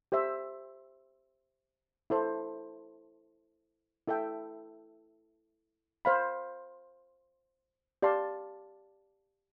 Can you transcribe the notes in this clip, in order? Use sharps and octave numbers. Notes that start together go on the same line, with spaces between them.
G4 C5 E5
E4 A4 C5
E4 A4 E5 G5
C5 F5 B5
G4 D5 F5 A5 C6